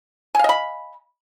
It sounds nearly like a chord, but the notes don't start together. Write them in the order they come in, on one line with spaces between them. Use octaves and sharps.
G#5 F5 D#5 B5